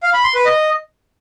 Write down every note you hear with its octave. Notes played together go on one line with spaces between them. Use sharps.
F5
B5
C6
B4
D#5